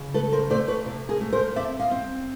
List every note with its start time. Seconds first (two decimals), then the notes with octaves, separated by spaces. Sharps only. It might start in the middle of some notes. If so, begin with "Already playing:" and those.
Already playing: C#3
0.14 A3 A4 B4
0.32 A#4 C5
0.50 A3 C5 D5
0.68 B4 C#5
0.86 C3
1.09 G#4 A#4
1.21 A3
1.33 A#4 C5
1.56 C4 D5 E5
1.79 D#5 F5
1.91 C4